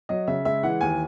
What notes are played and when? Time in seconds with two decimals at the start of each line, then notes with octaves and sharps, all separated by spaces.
0.09 F#3 D#5
0.28 C#3 E5
0.45 G#3 E5
0.63 E3 F#5
0.81 D#2 G#5